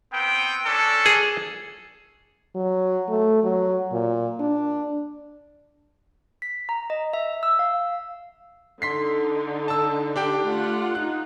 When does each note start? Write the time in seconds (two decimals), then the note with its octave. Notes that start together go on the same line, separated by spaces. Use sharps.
0.13 B3 C4 G5
0.66 C#4 D4 A4
1.06 G#4
2.55 F#3
3.08 A3
3.44 F#3
3.92 A#2
4.40 D4
6.42 B6
6.69 A#5
6.90 D#5
7.13 E5
7.43 E6
7.59 F5
8.82 D3 D#4 C6 B6 C7
9.68 A5 E6
10.16 D4 G4 G5
10.47 A3 F4 F#5
10.95 D#4 F4 F#6